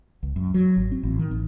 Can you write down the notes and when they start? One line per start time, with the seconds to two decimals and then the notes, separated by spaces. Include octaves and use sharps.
0.23 C#2
0.36 F#2
0.54 F#3
0.76 G#1
0.92 C4
1.03 A1
1.19 D#3
1.31 A1